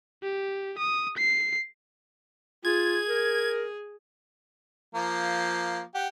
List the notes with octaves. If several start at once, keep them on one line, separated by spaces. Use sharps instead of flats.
G4
D#6
C7
F4 G#4 G#6
A#4
F3 A#3
G4 F#5